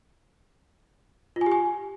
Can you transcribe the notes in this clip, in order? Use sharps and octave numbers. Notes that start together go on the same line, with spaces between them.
F4
G#5
G4
G#5